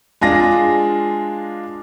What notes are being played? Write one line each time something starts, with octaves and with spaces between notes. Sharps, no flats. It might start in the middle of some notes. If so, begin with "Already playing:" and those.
G#3 D4 F4 G#4 A#6